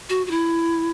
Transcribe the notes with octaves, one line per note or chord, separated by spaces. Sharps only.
F#4
F#4
E4